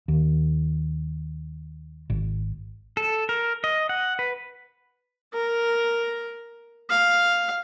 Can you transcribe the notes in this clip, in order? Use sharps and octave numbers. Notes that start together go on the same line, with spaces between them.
D#2
G#1
A4
A#4
D#5
F#5
B4
A#4
F5